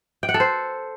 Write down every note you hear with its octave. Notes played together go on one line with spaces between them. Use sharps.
G5
F#5
A4
C5